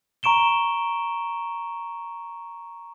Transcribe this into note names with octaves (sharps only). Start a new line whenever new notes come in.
A#5 C#6 D7 E7 G7